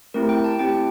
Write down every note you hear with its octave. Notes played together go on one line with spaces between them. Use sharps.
A3 C4 E4 G4 A#4
G5
A5
A3 C4 E4 G4 G5